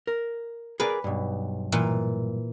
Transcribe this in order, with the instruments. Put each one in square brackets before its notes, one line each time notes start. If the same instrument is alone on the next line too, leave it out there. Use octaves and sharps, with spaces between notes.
[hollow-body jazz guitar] A#4
[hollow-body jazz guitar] G#4 A#4 D5 [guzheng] B4
[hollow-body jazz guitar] B1 G2
[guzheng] A#2 E3